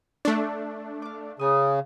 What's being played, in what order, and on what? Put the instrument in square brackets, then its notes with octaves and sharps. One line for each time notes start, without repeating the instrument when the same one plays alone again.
[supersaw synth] A3 D4 [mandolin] C#6 D6 E6
[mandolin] F5 D6
[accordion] C#3 [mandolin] D#4 G#5 D#6